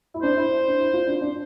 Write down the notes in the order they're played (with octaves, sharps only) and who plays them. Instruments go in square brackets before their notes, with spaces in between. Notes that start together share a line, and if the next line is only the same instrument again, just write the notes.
[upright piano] E4
[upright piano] D4 [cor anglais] C5
[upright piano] E4
D4
E4
F4
D4
D4